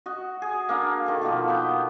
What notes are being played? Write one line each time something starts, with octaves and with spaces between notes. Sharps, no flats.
F#4 D#5
G#4
A#3 D4
D#3 A4
B2 D#3 F3 A#3
B3 G5